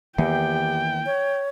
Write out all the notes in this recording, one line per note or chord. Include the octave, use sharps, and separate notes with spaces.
E2 D#3 E3 A#3 G4 G5
C#5